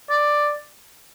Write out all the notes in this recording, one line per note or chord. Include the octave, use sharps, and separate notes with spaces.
D5